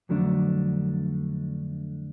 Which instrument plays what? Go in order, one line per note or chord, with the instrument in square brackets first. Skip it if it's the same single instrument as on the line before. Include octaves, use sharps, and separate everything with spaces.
[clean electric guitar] F2 D3 F#3 A3 D4